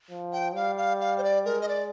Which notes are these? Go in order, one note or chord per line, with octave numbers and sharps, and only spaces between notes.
F3
G5
G3 F5
F5
F5
C5
D5
G#3 A#4
D#5
D5